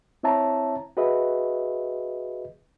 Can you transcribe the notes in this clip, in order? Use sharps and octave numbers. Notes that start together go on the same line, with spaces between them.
C4 E4 C#5 E5 A5 A#5
F#4 G#4 B4 D#5 E5